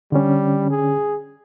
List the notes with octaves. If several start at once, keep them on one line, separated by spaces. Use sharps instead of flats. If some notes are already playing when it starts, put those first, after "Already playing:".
D3 G3 C#4
G#4